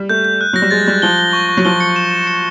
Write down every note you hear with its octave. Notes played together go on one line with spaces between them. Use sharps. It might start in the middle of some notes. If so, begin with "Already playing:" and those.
Already playing: G3
A3 G6
G6
F#6
F#3 A#6
G3
G#3 A6
G3 A6
F3 G7
G7
C#6
C#6
F#3
F3 G7
C#7
E7
E7
C#7